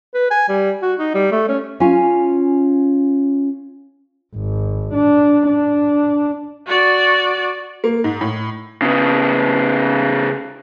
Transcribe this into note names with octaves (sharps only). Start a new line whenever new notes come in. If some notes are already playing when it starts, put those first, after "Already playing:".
B4
G#5
G3
F#4
D#4
G3
A3
C#4
C#4 F4 G#5
G#1
D4
D4
F#4 D5
A#3
G#2
A2
C#3 B3